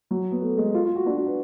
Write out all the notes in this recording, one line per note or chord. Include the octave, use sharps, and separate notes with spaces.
F#3
B3
A3
G#3
F4
F4
F#4
D4
F#4
B4